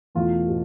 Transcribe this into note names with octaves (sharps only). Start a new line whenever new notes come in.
E2 B2 A3 F4
B2